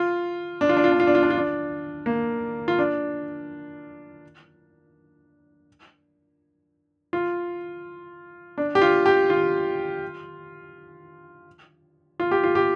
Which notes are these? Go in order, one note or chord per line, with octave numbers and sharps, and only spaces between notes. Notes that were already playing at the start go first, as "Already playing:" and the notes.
Already playing: F4
D4
F4
D4
F4
D4
F4
D4
F4
D4
F4
D4
A#3
F4
D4
F4
D4
G4
F4
G4
F4
F4
G4
F4
G4